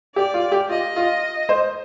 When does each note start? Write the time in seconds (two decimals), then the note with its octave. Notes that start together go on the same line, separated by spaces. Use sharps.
0.16 G4 D5
0.34 F4
0.52 G4
0.69 F4 D#5
0.96 F4
1.49 C5 D#5